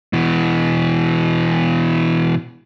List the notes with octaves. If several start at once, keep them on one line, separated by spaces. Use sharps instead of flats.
B2 E3